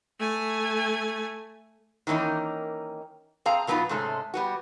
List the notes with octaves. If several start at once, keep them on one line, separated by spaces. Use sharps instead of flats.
A3 G#5
D#3 E3 A#3 C#4 D#4
C4 G#4 F5 A#5
B2 F#3 B3 D#4 F4
G#2 C3 G#3 A3 C#4
G3 B3 F#4